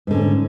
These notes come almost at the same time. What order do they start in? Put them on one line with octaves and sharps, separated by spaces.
G#2 D3 C#4